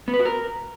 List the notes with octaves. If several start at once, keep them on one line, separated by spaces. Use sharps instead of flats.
B3
B4
F#4
A#4